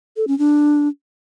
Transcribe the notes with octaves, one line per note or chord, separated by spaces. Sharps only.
A4
C#4
D4